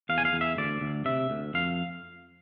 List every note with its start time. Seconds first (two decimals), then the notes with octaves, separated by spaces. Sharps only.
0.09 E2 F5
0.18 G#5
0.25 F5
0.33 E2
0.41 E5
0.57 D2 D5
0.81 D2
1.05 C3 E5
1.30 D2
1.54 F2 F5